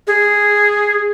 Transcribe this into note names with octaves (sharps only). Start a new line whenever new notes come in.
G#4